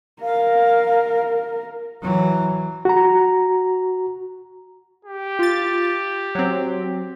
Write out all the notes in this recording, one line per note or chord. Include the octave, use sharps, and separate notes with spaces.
A#4 F5
E3 F#3
F#4 A#5
G4
F4 A6
F#3 C4